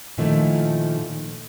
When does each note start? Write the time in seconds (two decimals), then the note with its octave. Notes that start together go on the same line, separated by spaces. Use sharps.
0.18 A#2 D#3 F3 A3 E4